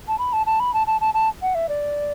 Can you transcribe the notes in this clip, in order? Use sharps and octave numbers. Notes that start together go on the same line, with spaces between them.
A5
B5
A5
A5
B5
A5
A5
A5
A5
F#5
E5
D5